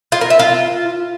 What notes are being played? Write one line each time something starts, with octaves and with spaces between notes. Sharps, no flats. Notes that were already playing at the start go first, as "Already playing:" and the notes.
F4
A#4
E5
F4